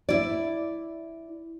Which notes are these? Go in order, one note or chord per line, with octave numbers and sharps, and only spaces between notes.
E4 D5